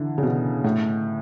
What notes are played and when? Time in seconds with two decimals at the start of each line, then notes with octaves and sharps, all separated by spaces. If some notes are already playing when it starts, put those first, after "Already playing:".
Already playing: D3 E3
0.18 C#3
0.23 B2
0.64 A2